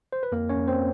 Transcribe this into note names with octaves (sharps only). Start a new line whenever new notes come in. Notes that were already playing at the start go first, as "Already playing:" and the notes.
C5
B4
F2 A#3 A#4
C#4 C#5
F2
C4 C5